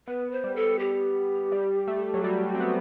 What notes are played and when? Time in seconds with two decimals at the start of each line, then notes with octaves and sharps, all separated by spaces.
0.07 B3 B4
0.32 C5
0.44 G3
0.56 A4
0.79 G4
1.52 G3
1.87 A3
2.14 F#3
2.24 G3 F#4
2.47 F#4
2.55 C4
2.60 B3